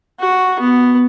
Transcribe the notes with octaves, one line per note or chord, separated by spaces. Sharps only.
F#4
B3